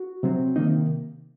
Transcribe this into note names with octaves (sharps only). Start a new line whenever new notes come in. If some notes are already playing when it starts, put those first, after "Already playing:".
Already playing: F#4
C3 F#3 C4
C3 D#3 A#3 D#4